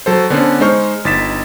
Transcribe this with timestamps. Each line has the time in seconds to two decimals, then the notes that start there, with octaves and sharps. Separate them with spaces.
0.06 F#3 A4 C5
0.30 D3 B3 C#4 A4 C5
0.60 G#3 D#4 C5 C#6 F6
1.05 G1 D#4 A6 B6 E7